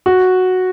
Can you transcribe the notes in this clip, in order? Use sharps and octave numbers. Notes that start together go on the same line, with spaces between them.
F#4